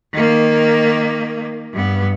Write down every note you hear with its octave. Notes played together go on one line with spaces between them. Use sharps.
D#3 A#3
G2 B3